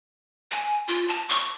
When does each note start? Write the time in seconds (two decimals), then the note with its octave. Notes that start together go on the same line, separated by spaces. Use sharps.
0.51 G#5
0.88 F4
1.08 A5
1.29 C#6